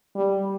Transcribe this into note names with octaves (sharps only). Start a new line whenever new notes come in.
G3